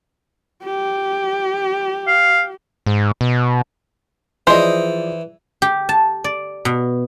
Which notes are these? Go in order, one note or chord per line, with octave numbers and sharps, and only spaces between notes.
G4
F5
G#2
B2
E3 F3 G#4 C5 D5 D#5
G4
A5
D5
B2